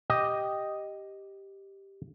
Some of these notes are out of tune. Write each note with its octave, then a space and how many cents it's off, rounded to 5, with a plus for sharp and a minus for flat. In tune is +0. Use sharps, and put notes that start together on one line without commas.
G4 +0 D#5 +0